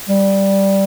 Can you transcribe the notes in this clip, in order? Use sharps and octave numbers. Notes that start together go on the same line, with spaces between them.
G3